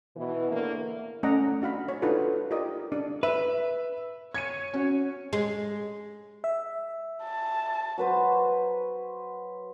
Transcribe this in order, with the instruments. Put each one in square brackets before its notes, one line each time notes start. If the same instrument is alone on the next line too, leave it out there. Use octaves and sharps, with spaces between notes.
[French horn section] B2 E3
E2 A2 D3 A3 A#3
[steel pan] A3 C#4 D5 D#5 F#5 A#5
D4 F#4 F5 B5
C#5
D4 D#4 F4 F#4 A4 B4
F4 G4 A#4 D5 D#5
D4
[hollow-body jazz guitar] B4 [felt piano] E5
[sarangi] C#5 [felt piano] G#6 C#7 D#7
[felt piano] C#4 F#4
[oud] G#3
[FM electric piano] E5
[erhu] A5
[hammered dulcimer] F#3 B4 C5